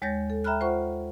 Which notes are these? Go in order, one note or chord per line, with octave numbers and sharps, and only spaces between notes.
D#2 G#3 C#5 G6 A6 A#6
A4
E5 G5 A#5 B5 F6 F#6
F4 C5 E5 F#5 C#6